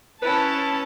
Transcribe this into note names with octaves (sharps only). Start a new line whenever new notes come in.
C#4 E4 B4 A5